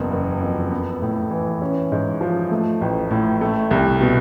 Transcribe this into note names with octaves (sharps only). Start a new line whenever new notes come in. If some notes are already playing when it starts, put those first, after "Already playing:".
Already playing: F#1 E2
F#1
F2
B3
A2
E3
C#4
G#2
F3
A3
A1
A2
A3
C2
B2